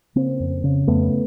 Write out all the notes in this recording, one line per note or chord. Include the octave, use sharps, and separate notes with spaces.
C#3 A#3 C4
F2
C#3
F2 A3 B3